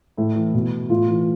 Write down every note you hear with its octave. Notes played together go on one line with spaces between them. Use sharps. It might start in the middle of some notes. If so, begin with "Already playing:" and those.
A2 E4
E3
B2
A2 F4
E3